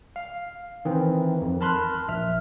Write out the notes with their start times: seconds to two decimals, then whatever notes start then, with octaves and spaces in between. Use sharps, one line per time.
0.16 F5
0.85 D#3 E3 C4
1.41 F2
1.61 A#4 A5 B5 C6 F6 F#6
2.08 A#1 E5 F6